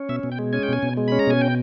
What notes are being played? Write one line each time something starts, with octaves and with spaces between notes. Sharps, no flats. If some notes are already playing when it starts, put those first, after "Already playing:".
Already playing: C#4
B2 E5
B2
G5
G#3
C#4 G#5
G5
B2 G#5
B2
G#3
C#4 B5
A#5
B2 G#5
G5